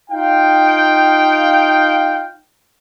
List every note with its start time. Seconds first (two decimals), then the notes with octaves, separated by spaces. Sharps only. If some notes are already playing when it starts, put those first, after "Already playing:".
0.10 D#4 F4 F5 G5